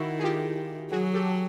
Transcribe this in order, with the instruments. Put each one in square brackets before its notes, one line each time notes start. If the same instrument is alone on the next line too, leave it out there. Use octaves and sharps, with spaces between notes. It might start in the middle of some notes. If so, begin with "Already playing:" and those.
Already playing: [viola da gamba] D#3 [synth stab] E4 F#4
[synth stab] G#4
F4 G4
[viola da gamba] F#3 [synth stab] F#4 G#4
[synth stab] G4 A4